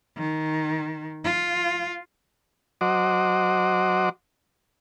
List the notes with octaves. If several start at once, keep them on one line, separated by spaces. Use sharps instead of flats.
D#3
F4
F#3 F#4 C5 D#5 D6